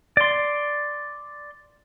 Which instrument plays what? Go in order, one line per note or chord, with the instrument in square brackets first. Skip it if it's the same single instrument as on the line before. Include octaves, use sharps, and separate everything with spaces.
[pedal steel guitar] D5 C6